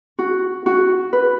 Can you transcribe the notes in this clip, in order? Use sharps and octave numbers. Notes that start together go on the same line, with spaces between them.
F#4
F#4
B4